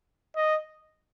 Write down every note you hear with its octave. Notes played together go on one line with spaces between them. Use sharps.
D#5